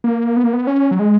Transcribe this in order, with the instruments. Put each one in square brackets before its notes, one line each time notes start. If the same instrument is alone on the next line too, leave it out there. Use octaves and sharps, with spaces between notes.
[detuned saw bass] A#3
B3
A#3
B3
C#4
F#3
G#3